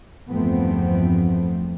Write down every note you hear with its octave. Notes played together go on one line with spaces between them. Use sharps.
G1 E2 F3 A3 B3 C4